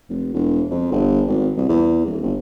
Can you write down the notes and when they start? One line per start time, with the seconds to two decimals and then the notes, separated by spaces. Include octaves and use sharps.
0.09 F1
0.34 E1
0.71 F2
0.92 G1
1.28 G#1
1.57 C2
1.69 E2
2.05 D#1
2.22 G1